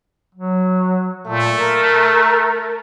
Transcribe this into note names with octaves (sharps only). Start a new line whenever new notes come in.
F#3
A#2 A3
A#4